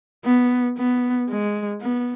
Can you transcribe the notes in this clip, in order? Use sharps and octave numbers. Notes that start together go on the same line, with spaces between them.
B3
B3
G#3
B3